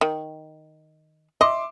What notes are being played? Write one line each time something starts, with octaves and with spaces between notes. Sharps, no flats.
D#3
D#5 E5 C6 D6